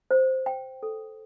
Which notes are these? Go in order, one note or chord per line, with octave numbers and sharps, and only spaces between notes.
C5
G5
A4